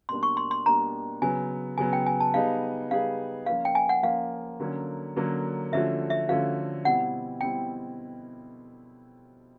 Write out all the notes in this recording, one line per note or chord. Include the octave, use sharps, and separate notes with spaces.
B2 G3 A#3 D4 C6
C#6
C6
C6
B2 G3 A#3 D4 A#5
C#3 F#3 B3 G#5
C#3 F#3 B3 G#5
G5
G#5
A5
G3 B3 D#4 G#4 F5
G3 B3 D#4 G#4 F5
F3 A#3 C#4 F4 F5
G5
G#5
F#5
F3 A#3 C#4 F4 F5
D3 F#3 A#3 C#4
D3 F#3 A#3 C#4
D3 F3 A3 C#4 F#4 E5
E5
D3 F3 A3 C#4 F#4 F5
B2 G3 C4 E4 F#5
B2 G3 C4 E4 G5